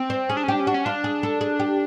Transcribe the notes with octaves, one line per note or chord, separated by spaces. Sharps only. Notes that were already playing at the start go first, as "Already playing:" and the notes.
Already playing: C4
C5
C#4 G#4
D4
C#4
D4 G4
C#4
D4 F#4
C#4
D4 F4
G#4
A4
G#4
G4